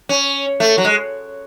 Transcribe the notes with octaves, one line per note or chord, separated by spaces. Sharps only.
C#4
A3
F#3
G#3